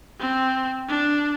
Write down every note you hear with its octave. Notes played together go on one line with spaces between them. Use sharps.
C4
D4